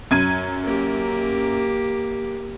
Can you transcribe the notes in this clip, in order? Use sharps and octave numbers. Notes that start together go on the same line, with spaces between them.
F#2 G#6 D#7
A#3 G4